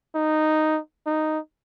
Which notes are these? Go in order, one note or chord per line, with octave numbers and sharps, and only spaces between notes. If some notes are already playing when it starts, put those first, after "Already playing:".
D#4
D#4